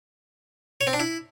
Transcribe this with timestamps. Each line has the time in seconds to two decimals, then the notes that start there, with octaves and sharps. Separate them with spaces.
0.81 C#5
0.87 C4
0.93 D4
1.00 E4